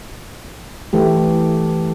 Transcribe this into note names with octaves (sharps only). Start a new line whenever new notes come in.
E3 A3 G4